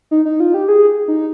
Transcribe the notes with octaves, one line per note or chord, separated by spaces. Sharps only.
D#4
D#4
F4
G4
G#4
D#4